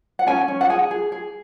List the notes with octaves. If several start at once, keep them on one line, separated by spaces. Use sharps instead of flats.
F#5
C#4 G#5
C#4
F#5
G#4 G#5
G#4
G#4